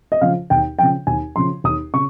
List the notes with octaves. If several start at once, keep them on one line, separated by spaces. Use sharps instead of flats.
D#5
C#3 F3 F5
D#2 G5
C#3 F3 G5
D#2 G#5
C#3 F3 C6
D#2 D#6
C#3 C#6